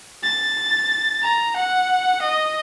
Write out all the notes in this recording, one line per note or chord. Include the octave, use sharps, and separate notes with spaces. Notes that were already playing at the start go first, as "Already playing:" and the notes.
A6
A#5
F#5
D#5